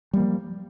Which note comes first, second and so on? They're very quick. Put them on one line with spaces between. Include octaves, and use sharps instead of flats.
G3 A#3 F3